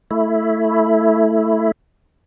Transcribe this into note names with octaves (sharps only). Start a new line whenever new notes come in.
A3 E4